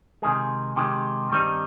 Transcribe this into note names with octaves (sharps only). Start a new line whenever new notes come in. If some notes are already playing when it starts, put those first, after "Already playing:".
C3 D#3 G#3 G#4
C3 D#3 G#3 G4
G2 D#3 G3 C4 D#4